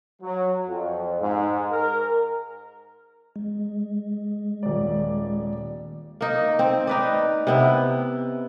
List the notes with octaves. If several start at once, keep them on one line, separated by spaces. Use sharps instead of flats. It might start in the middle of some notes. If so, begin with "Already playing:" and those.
F#3
F2
G#2
A#4
G#3
D#1 D5
A#3 D#4
C4
D#4 B4 D5
C3 B3 E4